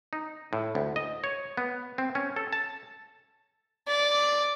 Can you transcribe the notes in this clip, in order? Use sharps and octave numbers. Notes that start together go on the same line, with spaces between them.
D#4
A2
D2
D#5
C#5
B3
C4
C#4
A4
A5
D5